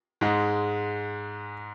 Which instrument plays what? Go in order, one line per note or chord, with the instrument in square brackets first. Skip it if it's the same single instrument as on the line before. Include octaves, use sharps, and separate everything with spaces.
[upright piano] G#2 G#3